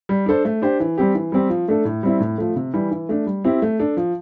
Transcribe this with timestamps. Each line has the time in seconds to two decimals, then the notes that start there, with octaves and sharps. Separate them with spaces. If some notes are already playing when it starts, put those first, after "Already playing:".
0.09 G3
0.26 D4 A4 C5
0.45 A3
0.62 D4 G4 C5
0.80 E3
0.98 G3 C4 G4
1.15 E3
1.32 G3 C4 G4
1.50 F3
1.68 A3 D4 A4
1.85 A2
2.03 G3 C4 E4
2.20 A2
2.38 F3 A3
2.56 C3
2.74 E3 G3
2.91 E3
3.09 A3 D4
3.26 G3
3.44 C4 E4 G4
3.62 A3
3.79 D4 A4
3.97 F3